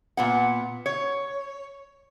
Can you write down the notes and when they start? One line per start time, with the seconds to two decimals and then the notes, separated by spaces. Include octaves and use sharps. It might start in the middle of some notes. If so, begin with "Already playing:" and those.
0.17 A#2 B3 F#5
0.86 C#5